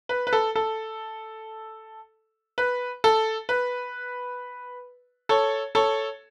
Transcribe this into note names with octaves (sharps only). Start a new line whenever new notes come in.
B4
B4
A4
A4
B4
A4
B4
A4 C#5
A4 C#5